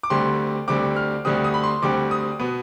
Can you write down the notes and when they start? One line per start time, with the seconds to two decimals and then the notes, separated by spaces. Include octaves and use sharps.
0.03 D6
0.10 D2 D3 G3 C4 C6
0.68 D2 D3 G3 C4 D6
0.96 F6
1.25 D2 D3 G3 C4 D#6
1.44 D#6
1.54 B5
1.63 C6
1.82 D2 D3 G3 C4 D6
2.11 D#6
2.40 B2 B3